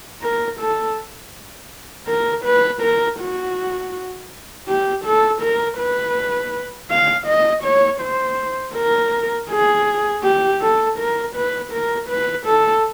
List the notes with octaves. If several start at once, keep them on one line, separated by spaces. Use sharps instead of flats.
A#4
A4
A#4
B4
A#4
F#4
G4
A4
A#4
B4
F5
D#5
C#5
C5
A#4
G#4
G4
A4
A#4
B4
A#4
B4
A4